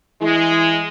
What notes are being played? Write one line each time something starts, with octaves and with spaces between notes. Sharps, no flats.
E3 G#3